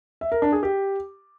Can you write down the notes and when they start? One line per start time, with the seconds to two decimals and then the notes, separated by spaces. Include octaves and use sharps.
0.21 E5
0.32 A#4
0.42 D4
0.52 G#4
0.63 G4